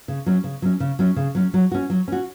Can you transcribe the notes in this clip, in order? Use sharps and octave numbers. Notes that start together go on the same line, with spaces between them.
C#3
F#3 C#4
C#3
F#3 C#4
C#3
F#3 C#4
C#3
F#3 C#4
F#3
C#4 F#4
F#3
C#4 F#4